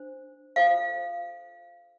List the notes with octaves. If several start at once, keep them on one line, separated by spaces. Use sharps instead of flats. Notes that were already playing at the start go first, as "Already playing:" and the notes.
Already playing: D4 C5
F4 A4 C5 F5